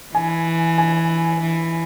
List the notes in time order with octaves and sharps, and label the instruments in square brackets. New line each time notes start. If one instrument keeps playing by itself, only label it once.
[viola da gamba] E3 [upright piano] G#5
[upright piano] G#5
[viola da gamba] E3